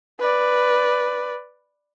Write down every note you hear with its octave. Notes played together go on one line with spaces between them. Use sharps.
B4 D5